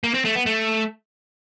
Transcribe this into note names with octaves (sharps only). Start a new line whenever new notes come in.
A#3
C4
A3
B3
A3